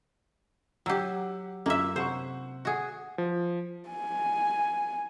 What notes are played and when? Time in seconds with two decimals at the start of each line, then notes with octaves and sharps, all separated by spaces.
0.86 F#3 G4 F#5 G5 E6
1.66 F#2 A#3 F4 E5 E6
1.96 C3 C5 F#5 C#6
2.65 F#4 G#4
3.18 F3
3.89 G#5